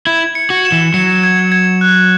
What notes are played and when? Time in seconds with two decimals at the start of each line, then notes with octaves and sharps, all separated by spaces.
0.06 E4 G#6
0.35 C#7
0.50 F#4
0.65 E7
0.72 E3
0.94 F#3 C#7
1.23 G#6
1.52 G#6
1.81 F#6